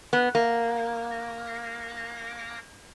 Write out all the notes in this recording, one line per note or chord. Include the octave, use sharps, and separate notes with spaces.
B3
A#3